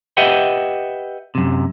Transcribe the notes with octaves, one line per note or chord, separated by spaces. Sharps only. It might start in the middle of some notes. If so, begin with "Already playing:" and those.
G4 B4 D#5 E5 F#5 G5
F#2 C3